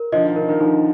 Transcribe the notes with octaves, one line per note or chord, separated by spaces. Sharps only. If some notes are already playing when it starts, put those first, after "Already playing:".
Already playing: A#4
D3 F3 D#5
D#3
D3 A#4
D#3
D3 F3 D#4